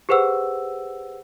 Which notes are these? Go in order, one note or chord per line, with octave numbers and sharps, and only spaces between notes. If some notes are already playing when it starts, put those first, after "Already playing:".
G4 G#4 B4 C5 F#5 E6